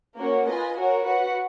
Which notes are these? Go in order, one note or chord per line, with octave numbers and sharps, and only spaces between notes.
A#3 C#4 F#4 C#5
F4 B4 D#5 G#5
F#4 A#4 C#5
F#4 B4 F#5